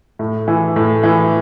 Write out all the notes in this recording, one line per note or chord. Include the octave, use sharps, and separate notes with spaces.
A2
E3
A2
E3